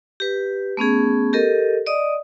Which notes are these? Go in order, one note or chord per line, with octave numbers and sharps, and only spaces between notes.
G4 B4
A3 B3 C#4 G#4
G4 A4 A#4 D#5
D5 D#5 D#6